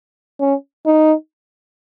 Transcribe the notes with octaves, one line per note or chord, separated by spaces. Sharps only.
C#4
D#4